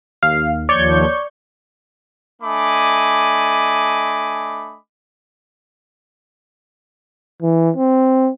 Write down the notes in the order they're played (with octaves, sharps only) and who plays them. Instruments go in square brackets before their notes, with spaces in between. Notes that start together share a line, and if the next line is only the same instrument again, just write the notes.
[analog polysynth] D#2 [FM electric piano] F5
[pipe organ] D#2 F3 [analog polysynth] C#5 C#6 G6 [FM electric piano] D5
[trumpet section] A3 D4 D#5 G#5 B5 D6
[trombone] E3
C4